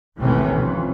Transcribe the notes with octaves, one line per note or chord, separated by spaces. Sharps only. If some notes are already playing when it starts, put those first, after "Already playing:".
G#1 D#2 A2 C3 E3 C#4
F2